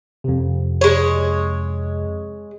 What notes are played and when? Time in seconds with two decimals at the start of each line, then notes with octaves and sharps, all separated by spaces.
0.24 F2 C3
0.81 G#3 C#5